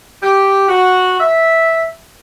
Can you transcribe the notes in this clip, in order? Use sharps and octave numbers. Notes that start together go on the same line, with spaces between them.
G4
F#4
E5